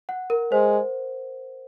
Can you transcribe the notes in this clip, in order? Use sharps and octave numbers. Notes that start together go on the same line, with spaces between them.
F#5
A#4
G#3 C5